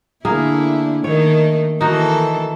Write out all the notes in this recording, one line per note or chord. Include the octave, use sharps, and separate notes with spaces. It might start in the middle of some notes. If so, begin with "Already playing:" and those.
D3 A3 A#3 E4 G#4
D#3 A3 D#4 C#5
D#3 E3 D#4 F#4 A4